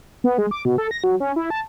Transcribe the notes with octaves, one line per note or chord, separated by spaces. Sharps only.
B3
G#3
D6
B2
A4
A#6
F#3
C#4
E4
A5